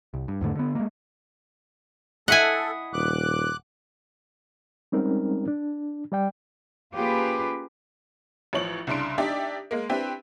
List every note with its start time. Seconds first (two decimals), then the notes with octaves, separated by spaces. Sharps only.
0.14 C2
0.28 G2
0.41 E2 G#2 D3 A3
0.55 D3 B3
0.75 G#3 A#3
2.28 E4 A4 D#5 F#5 G#5
2.93 D#1 D6 F#6
4.92 G3 G#3 C4 C#4 D#4 A#4
5.48 D4
6.12 G3 D5 G5
6.94 A#3 C#4 F4 G4 G#4 B4
8.53 A1 F3 C#5 F#7
8.87 C2 C#3 D4 C6 D7
9.18 D4 D#4 G4 D5 E5
9.71 G#3 A#3
9.89 C4 D4 E4 G4 B4